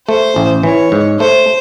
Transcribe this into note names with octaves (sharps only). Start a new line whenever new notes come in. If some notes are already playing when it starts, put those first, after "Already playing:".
A3 C5
A1
E3 C#5
G#2
A3 C5